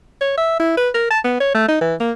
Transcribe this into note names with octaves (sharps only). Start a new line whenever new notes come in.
C#5
E5
E4
B4
A#4
A5
B3
C#5
A3
D#4
E3
A#3